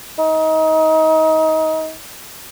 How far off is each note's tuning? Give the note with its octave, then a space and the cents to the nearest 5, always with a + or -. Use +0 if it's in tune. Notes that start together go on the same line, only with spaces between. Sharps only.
D#4 +25